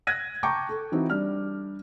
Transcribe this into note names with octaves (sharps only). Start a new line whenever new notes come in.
F#6 G#6 A#6 D#7
G5 A5 A#5 C#6 D6 G6
A4
E3 C4 D#4 E4 F#4
G3 D4 F6